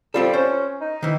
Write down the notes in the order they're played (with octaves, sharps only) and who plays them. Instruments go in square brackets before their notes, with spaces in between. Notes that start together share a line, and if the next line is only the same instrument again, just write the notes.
[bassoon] G3 [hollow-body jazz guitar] C4 F4 A4
[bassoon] C#4 [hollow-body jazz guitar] C5
[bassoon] D#4
[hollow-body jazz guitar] D#3 E3